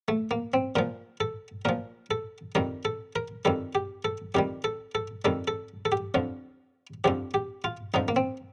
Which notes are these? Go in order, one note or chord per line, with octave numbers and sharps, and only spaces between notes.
A3
A#3
C4
A#2 F3 A#4
A4
A#2 F3 A#4
A4
F2 D#3 G3 A#4
A4
A#4
F2 D#3 G3 A4
G4
A4
F2 D#3 G3 G4
A4
A4
F2 D#3 G3 A4
A4
A4
G4
F2 D3 F3
F2 D3 F3 G4
G4
F4
F2 D3 F3 D#4
A#3
C4